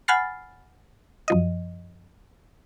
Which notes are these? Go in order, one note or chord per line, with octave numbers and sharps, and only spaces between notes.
F#5 G#5 B5 F6 A6 C7
F#2 F3 D#5